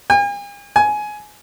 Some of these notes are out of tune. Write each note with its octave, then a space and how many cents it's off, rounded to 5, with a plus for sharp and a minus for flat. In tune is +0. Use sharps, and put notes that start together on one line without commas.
G#5 -45
G#5 +15